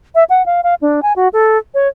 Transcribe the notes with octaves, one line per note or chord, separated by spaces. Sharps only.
E5
F#5
F5
F5
D4
G#5
F#4
A4
C#5